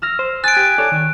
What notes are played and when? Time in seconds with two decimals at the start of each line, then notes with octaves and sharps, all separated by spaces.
0.02 E6 F6 A#6
0.19 C5
0.44 G#5 D#6 F#6 A6 D7
0.57 G4
0.78 A4 C#5 D5
0.92 D#3